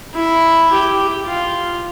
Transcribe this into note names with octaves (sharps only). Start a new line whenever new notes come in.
E4
G4
F4